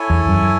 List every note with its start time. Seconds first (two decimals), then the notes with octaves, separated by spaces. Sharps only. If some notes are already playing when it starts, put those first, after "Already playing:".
Already playing: E4 A4 C#5 G#5
0.10 E2
0.28 F#2